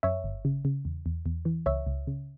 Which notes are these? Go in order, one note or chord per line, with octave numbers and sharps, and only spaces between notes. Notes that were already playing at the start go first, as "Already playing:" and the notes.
F#2 C#5 E5
G1
C#3
C#3
E2
E2
E2
E3
C#2 C#5 E5
C#2
C#3